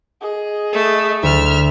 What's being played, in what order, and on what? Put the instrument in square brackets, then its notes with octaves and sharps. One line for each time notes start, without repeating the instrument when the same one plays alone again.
[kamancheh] G#4 D#5
[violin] A3
[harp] D2 [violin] E5 F6